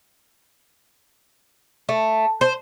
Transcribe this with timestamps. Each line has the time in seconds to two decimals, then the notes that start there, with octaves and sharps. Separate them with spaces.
1.89 A3
2.41 C5